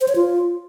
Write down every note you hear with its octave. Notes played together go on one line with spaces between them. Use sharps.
C5
C#5
F4